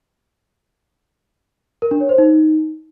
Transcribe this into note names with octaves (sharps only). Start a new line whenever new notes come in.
A#4
D4
C#5
C5
D#4